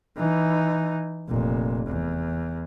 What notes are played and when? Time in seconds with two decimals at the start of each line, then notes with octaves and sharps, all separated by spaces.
0.17 E3 D#4
1.29 F1 A#2
1.86 E2